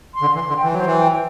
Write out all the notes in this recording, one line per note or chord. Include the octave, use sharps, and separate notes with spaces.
C6
D3
E3 C6
D3
G5
E3
F#3 C5
E3
G5